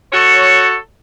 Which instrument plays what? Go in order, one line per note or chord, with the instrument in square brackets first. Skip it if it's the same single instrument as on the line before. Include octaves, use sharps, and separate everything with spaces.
[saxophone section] F#4 A4 C#5